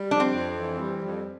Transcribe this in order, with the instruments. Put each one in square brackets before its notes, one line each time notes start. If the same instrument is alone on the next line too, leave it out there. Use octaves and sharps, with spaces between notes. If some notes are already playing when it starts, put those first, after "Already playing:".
Already playing: [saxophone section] G3
[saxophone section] F2 [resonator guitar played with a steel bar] D4
[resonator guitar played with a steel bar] C4
[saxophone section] F2
E3
G3
F2